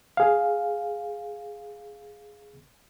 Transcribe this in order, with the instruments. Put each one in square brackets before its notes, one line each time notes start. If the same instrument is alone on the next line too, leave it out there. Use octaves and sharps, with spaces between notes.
[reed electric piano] G#4 F5